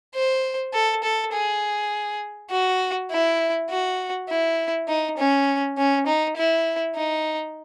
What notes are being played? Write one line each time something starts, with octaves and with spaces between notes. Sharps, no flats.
C5
A4
A4
G#4
F#4
E4
F#4
E4
D#4
C#4
C#4
D#4
E4
D#4